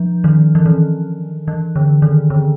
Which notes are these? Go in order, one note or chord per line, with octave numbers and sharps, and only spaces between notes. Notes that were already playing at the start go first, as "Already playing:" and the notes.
Already playing: F3
D#3
E3
D#3
E3
D3
D#3
D3